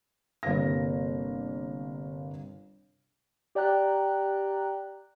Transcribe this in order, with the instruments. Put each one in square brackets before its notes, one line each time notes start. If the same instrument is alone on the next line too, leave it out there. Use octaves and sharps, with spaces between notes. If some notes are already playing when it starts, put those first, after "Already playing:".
[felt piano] G1 C3 A#3 F5 A#6
[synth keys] G4 D5 G5 A#5 F#6